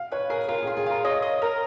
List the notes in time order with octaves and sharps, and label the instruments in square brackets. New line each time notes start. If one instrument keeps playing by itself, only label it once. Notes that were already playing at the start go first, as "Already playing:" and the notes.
Already playing: [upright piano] F5
[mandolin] B4 [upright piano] C#5
[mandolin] G#4 [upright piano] A#4
[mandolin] F4 [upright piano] A#4
[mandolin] F4 [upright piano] G#4
[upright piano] G#4
[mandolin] F4 [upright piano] A#4
[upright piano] C#5 [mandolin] D#5
[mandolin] D#5
A#4